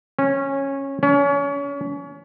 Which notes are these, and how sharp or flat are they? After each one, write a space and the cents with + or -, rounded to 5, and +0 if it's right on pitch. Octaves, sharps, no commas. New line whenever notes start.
C#4 -15
C#4 +30